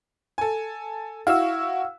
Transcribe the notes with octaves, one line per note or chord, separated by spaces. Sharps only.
A4 G#5
E4 F#4 F5 E6